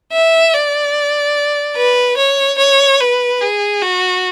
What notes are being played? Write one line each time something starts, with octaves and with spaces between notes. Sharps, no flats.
E5
D5
B4
C#5
C#5
B4
G#4
F#4